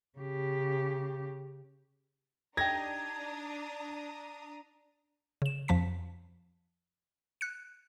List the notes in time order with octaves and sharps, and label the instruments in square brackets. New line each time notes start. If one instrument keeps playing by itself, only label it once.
[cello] C#3 G4
[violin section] D4 A#5 D#6 [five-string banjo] D#4 G4 [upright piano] G#6 A#6
[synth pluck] C#3 E7
F2 F3 A5 B6
F#6 C#7